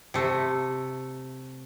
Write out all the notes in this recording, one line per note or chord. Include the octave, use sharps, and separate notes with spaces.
C3 A3